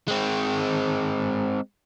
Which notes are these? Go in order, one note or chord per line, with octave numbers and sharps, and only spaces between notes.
G#3 C4